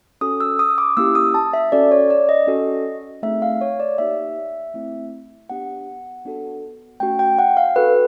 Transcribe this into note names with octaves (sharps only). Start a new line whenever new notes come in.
C#4 F#4 A4 D#6
E6
D#6
D6
A#3 C#4 E4 G4 E6
D#6
A5
E5
C#4 F#4 A4 D5
C#5
D5
D#5
C#4 F#4 A4
A3 C4 D#4 G#4 E5
F5
C#5
D5
A#3 D#4 G4 E5
A3 C4 E4
B3 D4 G4 F#5
B3 D4 F#4 A4
A3 C#4 F#4 G5
G5
F#5
F5
D4 F#4 A4 B4